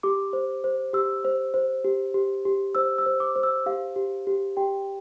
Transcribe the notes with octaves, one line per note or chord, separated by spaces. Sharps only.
G4 D6
C5
C5
G4 E6
C5
C5
G4
G4
G4
C5 E6
E6
C5
D6
C5
E6
G4 F5
G4
G4
G4 G5